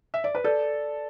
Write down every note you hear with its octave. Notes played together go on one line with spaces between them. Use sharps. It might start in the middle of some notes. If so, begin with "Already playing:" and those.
E5
D5
B4
A4 D5